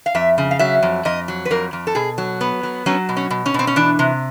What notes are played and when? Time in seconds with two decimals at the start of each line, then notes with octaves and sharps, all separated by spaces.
0.06 F5
0.15 F2 E5
0.38 C#3
0.51 F5
0.59 F#3 E5
0.83 F2
1.05 F2 D#5
1.28 F#3
1.45 B4
1.51 F2 A#4
1.73 F2
1.87 A4
1.95 B2 G#4
2.18 F#3
2.41 B3
2.63 F#3
2.86 F#3 C#4
3.09 B2
3.17 C#4
3.30 B2
3.46 C#4
3.54 B2 C4
3.67 C#4
3.76 E3 D4
3.99 C3